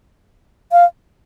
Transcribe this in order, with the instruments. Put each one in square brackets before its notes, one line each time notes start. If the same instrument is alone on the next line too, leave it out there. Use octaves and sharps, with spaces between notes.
[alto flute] F5